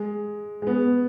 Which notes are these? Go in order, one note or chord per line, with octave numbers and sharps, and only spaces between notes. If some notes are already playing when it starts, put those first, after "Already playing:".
Already playing: G#3
G#3
B3